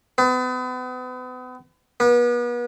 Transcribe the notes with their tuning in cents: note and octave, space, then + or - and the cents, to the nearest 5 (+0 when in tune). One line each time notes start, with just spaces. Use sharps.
B3 +40
B3 -35